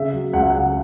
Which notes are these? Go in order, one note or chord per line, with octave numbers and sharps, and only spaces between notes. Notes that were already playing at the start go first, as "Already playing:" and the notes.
Already playing: C#3 E5
F#3
C#2 F#5
E5
C#3 F#5